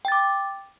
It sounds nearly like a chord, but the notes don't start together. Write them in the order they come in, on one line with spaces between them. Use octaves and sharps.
G5 A6 D6